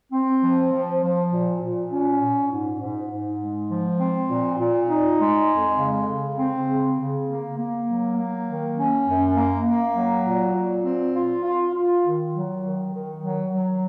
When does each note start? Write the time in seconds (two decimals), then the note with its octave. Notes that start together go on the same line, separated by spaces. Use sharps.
0.12 C4
0.42 F3
0.72 F3
1.02 F3
1.32 A#2
1.61 A#2
1.90 C#4
2.21 A#2
2.50 G#2
2.80 G#2
3.10 G#2
3.39 G#3
3.69 F3
3.99 C4
4.29 A#2
4.59 A#2
4.89 D#4
5.19 G#3
5.48 F2
5.78 C#3
6.07 C#3
6.38 C4
6.67 C#3
6.98 C#3
7.27 A#3
7.57 A#3
7.86 F#3
8.16 A#3
8.46 D#3
8.76 C#4
9.06 F#2
9.35 A#3
9.65 A#3
9.94 F#3
10.25 A#2
10.54 A#2
10.84 C4
11.14 F4
11.44 F4
11.73 F4
12.03 D#3
12.33 F#3
12.63 D#3
12.93 D#3
13.22 F#3
13.52 F#3